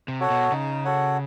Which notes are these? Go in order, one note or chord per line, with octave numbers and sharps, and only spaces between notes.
C3
F#4 A4 C#5 F#5
B2
C#3 D#4
F#4 A4 C#5 F#5